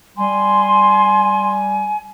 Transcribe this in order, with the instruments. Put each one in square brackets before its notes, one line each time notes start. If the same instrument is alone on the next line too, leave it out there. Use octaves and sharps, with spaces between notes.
[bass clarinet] G3 [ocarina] G#5 [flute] C6